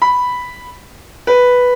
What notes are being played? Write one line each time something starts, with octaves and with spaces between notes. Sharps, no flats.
B5
B4